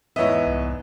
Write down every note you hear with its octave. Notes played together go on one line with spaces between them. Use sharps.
E2 G#2 B3 E4 B4 C#5 D#5 E5
C2